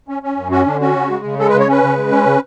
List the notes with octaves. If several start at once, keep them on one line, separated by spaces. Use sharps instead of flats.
C#4
C#4
F#2
C#4 F#4
D3 D4
C#4 F#4
C#3
G#3
C#3
G#3 A4
B4
C#3
C#5
C#4 B4
C#3
G#3
C#4
C#3